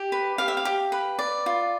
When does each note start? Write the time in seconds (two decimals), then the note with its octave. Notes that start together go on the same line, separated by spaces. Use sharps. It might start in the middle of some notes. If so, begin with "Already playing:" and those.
Already playing: G4
0.12 B4
0.38 G4 F5
0.48 E5
0.57 F5
0.65 G4
0.92 B4
1.19 D5
1.46 F4